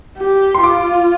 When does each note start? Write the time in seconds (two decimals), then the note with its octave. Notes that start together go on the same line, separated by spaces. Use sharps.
0.18 G4
0.54 C6
0.62 F4 D6